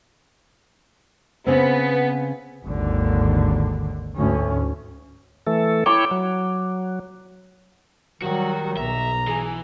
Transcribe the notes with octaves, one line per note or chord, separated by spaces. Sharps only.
C#3 B3 C4
G#1 D#2 D3
D2 G#2 C#4
E3 A3 A4
E4 C#5 G5 D6
F#3
D#3 F#3 G3 F#4 F#5
B1 E5 A#5
E3 G#4